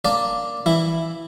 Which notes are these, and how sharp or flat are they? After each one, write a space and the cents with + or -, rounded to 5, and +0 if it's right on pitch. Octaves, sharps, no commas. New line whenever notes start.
A#3 +0 D4 +0 D5 +0
E3 +0 E4 -5